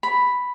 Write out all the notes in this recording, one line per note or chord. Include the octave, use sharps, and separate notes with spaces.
B5